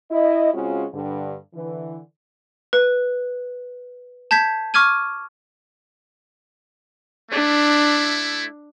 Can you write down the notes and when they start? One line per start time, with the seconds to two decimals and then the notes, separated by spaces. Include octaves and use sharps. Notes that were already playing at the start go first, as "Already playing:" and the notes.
0.11 E4 D#5
0.53 C#3 G#3 C4 C#4 F4 F#4
0.94 G2 D3
1.55 D3 E3
2.73 B4
4.31 A5 G6 G#6 B6
4.74 C#6 D6 F6 G#6 D#7
7.32 A3 D4 E4